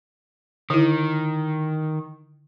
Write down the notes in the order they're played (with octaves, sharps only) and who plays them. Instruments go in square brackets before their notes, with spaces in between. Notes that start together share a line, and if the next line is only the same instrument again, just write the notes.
[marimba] D3 E4 [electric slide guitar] D#3